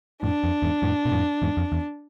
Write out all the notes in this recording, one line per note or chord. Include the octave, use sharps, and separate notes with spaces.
F2 A2 D4
F2
E2 G#2
F2 A2
B2
F2 A2
E2 G#2
F2
E2